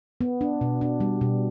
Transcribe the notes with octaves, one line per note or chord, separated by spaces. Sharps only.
B3
D4
B2
D4
G3
B2